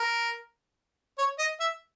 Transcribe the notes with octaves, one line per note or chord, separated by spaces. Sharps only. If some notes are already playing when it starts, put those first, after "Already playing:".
Already playing: A#4
C#5
D#5
E5